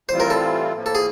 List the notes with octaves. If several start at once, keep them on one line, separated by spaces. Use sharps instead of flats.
A2 E3 G3 C4 F4 C5
A#4
A4
A2 F3 A#3
A4
G#4